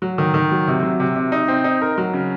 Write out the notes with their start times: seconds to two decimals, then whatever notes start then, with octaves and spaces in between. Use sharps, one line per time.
0.02 F#3
0.18 D#3
0.34 D#3
0.51 F#3
0.67 C3
0.83 F#3
1.00 C3
1.16 C3
1.32 D#4
1.48 C4
1.64 D#4
1.82 A#4
1.98 F#3
2.14 C#3